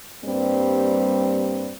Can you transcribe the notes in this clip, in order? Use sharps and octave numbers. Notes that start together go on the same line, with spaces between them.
G2 G3 A#3 C4